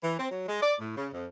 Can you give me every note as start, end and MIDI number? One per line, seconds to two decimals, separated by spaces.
0.04 0.18 52
0.19 0.29 60
0.31 0.49 54
0.49 0.60 56
0.62 0.75 74
0.81 0.95 45
0.97 1.08 49
1.14 1.27 41